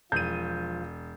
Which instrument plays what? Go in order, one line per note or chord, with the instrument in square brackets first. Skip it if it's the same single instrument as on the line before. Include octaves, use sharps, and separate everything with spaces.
[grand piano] E1 D#7 [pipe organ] F3 F4 [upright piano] G6